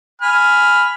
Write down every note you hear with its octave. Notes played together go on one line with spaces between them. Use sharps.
G#5 B5 F6